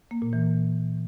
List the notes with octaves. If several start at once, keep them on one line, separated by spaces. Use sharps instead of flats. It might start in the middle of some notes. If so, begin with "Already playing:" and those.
A#3
A#2
E3